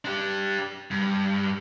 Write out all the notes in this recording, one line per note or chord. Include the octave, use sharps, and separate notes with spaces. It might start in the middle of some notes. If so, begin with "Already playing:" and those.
D4 G4
G2